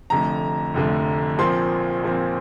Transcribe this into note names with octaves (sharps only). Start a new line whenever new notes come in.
F1 F2 D3 A3 A#5
F1 F2 D3 A3
A#1 A#2 F3 C4 C6
A#1 A#2 F3 C4